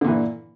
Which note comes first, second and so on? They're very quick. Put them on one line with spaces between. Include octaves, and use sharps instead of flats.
D3 A#2 E3